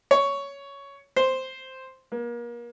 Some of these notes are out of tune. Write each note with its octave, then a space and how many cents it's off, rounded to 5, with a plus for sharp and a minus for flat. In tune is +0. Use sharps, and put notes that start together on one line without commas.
C#5 +10
C5 +0
A#3 +35